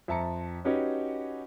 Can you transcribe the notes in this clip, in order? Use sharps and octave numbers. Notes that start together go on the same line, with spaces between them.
F2 E5 A5 A#5 C#7
C#4 D#4 F#4 G4 B4 C#5